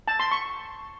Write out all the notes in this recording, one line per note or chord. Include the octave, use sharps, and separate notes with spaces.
A5
C6
C#6